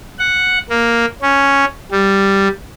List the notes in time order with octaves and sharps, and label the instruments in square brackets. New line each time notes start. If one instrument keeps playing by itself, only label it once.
[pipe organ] F#5
A#3
C#4
G3